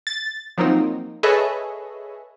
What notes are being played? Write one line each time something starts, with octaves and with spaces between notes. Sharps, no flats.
A6
F3 F#3 A#3 C4 D#4
G#4 A4 B4 C#5 D#5 E5